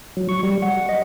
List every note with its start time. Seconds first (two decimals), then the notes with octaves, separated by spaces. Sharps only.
0.17 F#3
0.29 C#6
0.43 G3
0.62 F#5
0.89 D#5